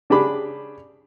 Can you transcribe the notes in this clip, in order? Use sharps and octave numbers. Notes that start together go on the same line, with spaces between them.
C#3 D4 G4 G#4 B5 D6